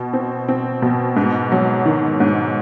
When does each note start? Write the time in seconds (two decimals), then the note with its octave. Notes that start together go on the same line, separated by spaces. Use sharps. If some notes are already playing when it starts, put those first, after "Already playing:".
Already playing: B2
0.13 C4
0.48 C4
0.82 B2
1.16 G#2
1.52 F#3
1.86 D#3
2.20 G#2